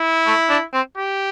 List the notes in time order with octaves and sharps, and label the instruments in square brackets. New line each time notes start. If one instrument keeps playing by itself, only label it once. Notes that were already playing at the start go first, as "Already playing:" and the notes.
Already playing: [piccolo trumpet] E4
[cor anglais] A3
D4
C4
[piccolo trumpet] G4